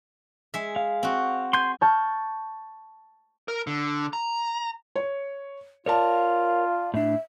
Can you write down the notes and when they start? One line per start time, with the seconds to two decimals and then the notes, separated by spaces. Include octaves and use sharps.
0.54 G#3 E5
0.76 F5
1.03 C4 F#4
1.53 G#5 C6 G6
1.81 A5 C#6 F6 G6
3.48 A#4
3.67 D3
4.13 A#5
4.96 C#5
5.86 F4 A#4 C#5 D5 F5 A5
6.94 A2 D4 E5